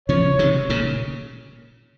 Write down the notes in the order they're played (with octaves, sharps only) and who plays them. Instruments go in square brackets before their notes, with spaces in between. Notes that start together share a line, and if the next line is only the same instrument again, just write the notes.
[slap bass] C#3 F3 [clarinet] C#5
[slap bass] C3 D#3
A#2 C#3